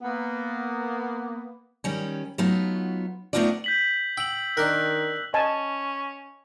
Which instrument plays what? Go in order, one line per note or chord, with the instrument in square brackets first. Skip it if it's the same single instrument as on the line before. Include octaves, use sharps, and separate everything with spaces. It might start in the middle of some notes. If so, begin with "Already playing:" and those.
[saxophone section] A#3 B3
[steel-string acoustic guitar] D#3 G3 C#4
F#3 A3 B3 D#4 F4
A3 B3 C4 D#4 F4 D5
[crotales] G6 B6 F#7
[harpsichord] G5 [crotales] E6 F#7
[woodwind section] D#3 [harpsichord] D4 A#4 [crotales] F#6
[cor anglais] C#4 [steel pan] D#5 G#5 A5